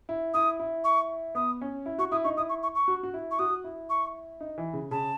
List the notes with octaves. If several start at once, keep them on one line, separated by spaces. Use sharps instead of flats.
E4
E4 D#6
E4
C#6
B3 D#6
C#4
E4
F#4 C#6
E4 D#6
D#4 C#6
E4 D#6
C#6
C#6
C#6
F#4
F#4
E4
C#6
F#4 D#6
E4
C#6
D#4
E3
C#3
C#3 A5